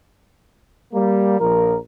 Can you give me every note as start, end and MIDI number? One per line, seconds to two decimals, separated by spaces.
0.93 1.36 55
0.93 1.36 58
1.39 1.76 34
1.39 1.76 53
1.39 1.76 70